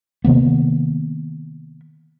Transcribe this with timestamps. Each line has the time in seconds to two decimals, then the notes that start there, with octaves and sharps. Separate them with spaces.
0.24 C3 D#3 A#3 B3